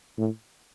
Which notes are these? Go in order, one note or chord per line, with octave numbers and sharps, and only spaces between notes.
A2